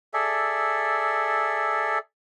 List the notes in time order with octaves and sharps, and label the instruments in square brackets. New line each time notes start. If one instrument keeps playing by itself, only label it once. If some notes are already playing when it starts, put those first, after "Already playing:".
[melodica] G#4 A4 D5 E5